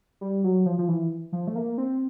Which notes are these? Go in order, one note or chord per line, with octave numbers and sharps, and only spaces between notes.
G3
F#3
F3
F3
E3
F3
A3
A#3
C4